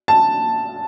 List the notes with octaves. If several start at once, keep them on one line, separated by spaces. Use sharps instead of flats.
A5